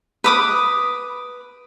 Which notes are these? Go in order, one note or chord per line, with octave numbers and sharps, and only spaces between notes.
B4 D6 D#6